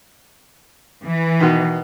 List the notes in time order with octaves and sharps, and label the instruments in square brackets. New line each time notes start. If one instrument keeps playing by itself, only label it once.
[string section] E3
[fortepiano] B2 D#3